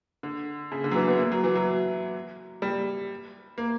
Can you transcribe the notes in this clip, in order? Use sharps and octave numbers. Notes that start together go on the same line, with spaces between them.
D3
C#3
D3
F#3
E3
B3
A#3
F#3
E3
F#3
G3
A#3